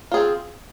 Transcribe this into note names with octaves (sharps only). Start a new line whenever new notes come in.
C4 F4 G#4